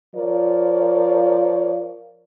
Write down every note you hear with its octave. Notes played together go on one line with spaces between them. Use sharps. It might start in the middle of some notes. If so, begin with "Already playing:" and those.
F3 F4 A#4 C#5 D5